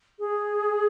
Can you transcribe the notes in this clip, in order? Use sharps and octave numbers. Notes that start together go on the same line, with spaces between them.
G#4